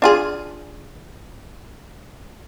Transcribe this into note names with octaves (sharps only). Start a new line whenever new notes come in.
D4 F4 G#4